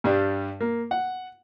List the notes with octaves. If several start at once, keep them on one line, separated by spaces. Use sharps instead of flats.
G2 G3 D4
A#3
F#5